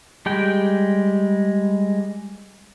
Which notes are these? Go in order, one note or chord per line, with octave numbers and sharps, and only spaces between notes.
G3 G#3 G5